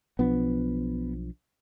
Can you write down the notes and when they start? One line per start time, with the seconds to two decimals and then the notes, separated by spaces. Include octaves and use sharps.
0.19 B1 F3 B3 D4